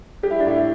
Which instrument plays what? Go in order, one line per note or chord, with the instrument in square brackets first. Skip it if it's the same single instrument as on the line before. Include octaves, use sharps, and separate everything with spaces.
[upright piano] G3 G4
E4
D4
A2 E4